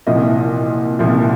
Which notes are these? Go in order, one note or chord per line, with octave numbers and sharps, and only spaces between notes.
C2 A#2 F3 D#5
C2 A#2 F3